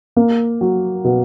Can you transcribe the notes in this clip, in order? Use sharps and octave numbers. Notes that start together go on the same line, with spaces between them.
A#3
F#3
B2